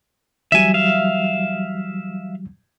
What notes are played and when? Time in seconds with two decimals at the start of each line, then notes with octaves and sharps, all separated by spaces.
0.52 E3 F#3 G3 E5 G#5
0.74 E5 F5